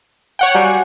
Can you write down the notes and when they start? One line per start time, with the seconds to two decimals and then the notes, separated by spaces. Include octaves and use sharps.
0.39 C#5 F#5 G5
0.54 F#3 G3 F5 G#5